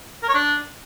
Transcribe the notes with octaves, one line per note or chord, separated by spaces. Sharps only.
A#4
C#5
D4